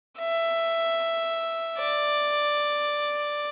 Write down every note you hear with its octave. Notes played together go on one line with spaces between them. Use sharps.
E5
D5